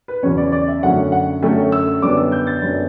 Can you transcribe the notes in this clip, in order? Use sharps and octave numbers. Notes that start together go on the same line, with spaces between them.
B4
E2 C#3 F#3 C#4 C#5
D5
D5
E5
F#2 D3 F#3 A3 C#4 F#5
F#5
F#2 D3 F#3 A3 C#4 G5
E6
F#2 D3 G3 B3 D4 D6
E6
G6
A6
F#2 D3 G3 B3 D4